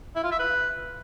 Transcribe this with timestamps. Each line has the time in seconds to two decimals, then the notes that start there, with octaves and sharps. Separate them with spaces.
0.16 E4
0.23 F4
0.31 E5
0.39 B4